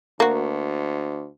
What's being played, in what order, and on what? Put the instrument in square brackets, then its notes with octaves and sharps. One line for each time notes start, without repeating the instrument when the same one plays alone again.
[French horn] D2 [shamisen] A#3 F#4